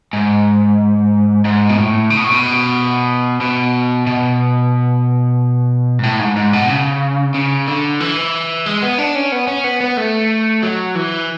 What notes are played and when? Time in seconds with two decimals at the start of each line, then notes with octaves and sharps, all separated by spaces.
0.13 G#2
1.45 G#2
1.69 B2
1.77 A2
2.10 C#3
2.17 B2
2.25 A2
2.31 B2
3.41 B2
4.07 B2
5.99 G#2
6.03 A2
6.20 G#2
6.36 G#2
6.53 B2
6.69 C#3
7.34 C#3
7.68 D3
8.00 E3
8.66 G#3
8.82 B3
8.98 D4
9.15 C#4
9.32 B3
9.47 C#4
9.64 B3
9.81 B3
9.97 A3
10.63 F#3
10.95 E3